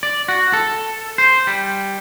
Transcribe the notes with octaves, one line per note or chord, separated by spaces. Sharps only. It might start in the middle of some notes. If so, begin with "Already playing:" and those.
D5
F#4
A4
C5
G3